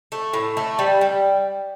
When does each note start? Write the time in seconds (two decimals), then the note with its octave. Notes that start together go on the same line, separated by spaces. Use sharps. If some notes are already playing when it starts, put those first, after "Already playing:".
0.12 A3
0.34 A2
0.57 A3
0.79 G3
1.01 G3